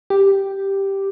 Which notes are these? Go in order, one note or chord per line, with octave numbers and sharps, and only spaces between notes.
G4